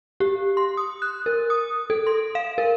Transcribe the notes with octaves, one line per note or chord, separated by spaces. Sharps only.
G4
C6
D#6
F#6
A#4
D#6
A4
C6
F5
A#4